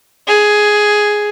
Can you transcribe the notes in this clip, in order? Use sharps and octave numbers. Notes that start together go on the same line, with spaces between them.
G#4